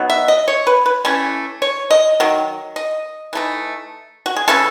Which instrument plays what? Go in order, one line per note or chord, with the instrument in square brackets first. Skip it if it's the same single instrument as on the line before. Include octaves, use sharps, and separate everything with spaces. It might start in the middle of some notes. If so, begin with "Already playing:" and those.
Already playing: [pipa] B2 F#3 B3 D#4
E5
D#5
C#5
B4
B4
E3 A3 C#4
C#5
D#5
D#3 F#3
D#5
E3 A3 D#4
F#4
G#4
C#3 E3 A3 C#4 A4